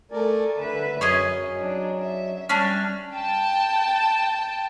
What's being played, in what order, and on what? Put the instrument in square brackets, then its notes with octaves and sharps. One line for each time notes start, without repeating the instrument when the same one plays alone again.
[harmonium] A3 A#4 D5 [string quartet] A4 G#5
[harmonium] D3 [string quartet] B4 E5
[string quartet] F#2 [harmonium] F#3 [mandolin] C#4 G#4 D#5
[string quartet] D4 D#4
E5
[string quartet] G3 F6 [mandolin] C#4 D4
[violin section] G5 A5